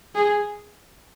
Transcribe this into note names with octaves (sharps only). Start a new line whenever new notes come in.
G#4